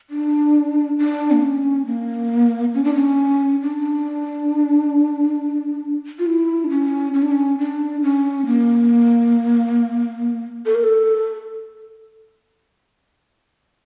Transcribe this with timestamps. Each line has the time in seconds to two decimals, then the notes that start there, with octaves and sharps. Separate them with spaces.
0.10 D4
0.98 D4
1.32 A#3
1.42 C#4
1.86 A#3
2.75 C#4
2.84 D4
2.95 C#4
3.62 D4
6.19 F4
6.26 E4
6.64 D4
6.69 C#4
7.14 C#4
7.22 D4
7.31 C#4
7.58 D4
8.02 C#4
8.46 A#3
10.66 A4
10.75 A#4
10.84 A4